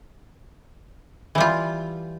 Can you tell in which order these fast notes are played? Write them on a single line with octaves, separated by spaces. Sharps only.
E3 G3 F4